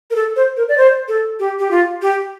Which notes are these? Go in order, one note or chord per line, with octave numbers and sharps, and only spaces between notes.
A#4
A4
C5
A#4
D5
C5
A4
G4
G4
F4
G4